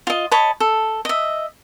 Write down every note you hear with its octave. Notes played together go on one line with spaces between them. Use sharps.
F4 D#5
C#5 D#5 A5 B5
A4
D#5 E5